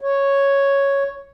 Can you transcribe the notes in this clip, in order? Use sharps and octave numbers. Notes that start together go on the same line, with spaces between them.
C#5